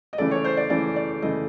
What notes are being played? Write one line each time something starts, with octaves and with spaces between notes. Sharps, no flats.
D#5
C#3 E3 A3 D5
C#5
C5
D5
C#3 E3 A3 D5
D5
C#3 E3 A3 D#5